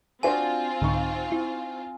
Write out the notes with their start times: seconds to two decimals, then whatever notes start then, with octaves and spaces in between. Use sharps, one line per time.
0.23 C4 D4 F4 F#4 C5 G#5
0.82 C2 G#2 D3 D#4 F5 C#6
1.32 E4